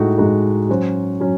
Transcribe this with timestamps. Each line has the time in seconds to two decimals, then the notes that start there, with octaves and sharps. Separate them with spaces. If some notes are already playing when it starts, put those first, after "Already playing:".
Already playing: A2 G#3 D#4 F#4 A4
0.18 A2 G#3 D#4 F#4 A4
0.69 F#3 C#4 F#4 C5
1.20 F#3 C#4